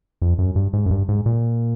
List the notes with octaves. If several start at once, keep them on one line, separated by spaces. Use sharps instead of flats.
F2
F#2
G2
G#2
F#2
G2
G#2
A#2